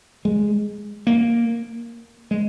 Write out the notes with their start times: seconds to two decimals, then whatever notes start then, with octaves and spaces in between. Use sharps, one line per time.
0.25 G#3
1.07 A#3
2.31 G#3